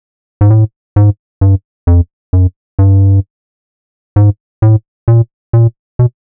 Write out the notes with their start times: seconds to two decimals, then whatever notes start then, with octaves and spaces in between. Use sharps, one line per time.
0.41 G#2
0.51 A2
0.96 G#2
1.41 G2
1.87 F2
2.33 F#2
2.79 G2
4.16 G#2
4.62 A2
5.08 A#2
5.53 A#2
5.99 B2